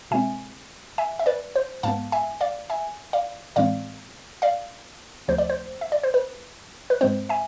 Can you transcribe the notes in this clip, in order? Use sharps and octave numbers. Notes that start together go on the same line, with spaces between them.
B2 G#3 C4 E5 G#5
E5 G#5
E5
B4 D5
C5
G#2 G#3 B3 F5 A5
E5 G#5
D5 F5
E5 G#5
D5 F5
A2 E3 G#3 C4 D5 F5
D5 F5
D2 C3 F3 A3 C5
D5
C5
E5
D5
C5
B4
B4
G#2 G#3 C4 C5
E5 G#5